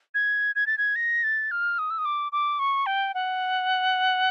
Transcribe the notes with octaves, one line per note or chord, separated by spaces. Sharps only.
G#6
G#6
A6
G#6
A#6
A6
F6
D#6
E6
D#6
D6
D6
C#6
G5
F#5